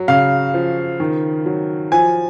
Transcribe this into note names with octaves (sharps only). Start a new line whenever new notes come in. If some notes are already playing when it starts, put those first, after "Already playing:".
Already playing: F#3
C#3 F5
F3
D#3
F#3
F3 G#5